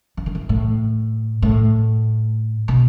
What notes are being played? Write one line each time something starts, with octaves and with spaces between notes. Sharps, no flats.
E3
D#3
E3
A2
A2
B2